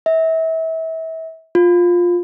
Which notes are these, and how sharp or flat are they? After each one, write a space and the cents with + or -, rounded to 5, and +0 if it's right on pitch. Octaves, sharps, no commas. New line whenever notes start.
E5 -30
F4 +10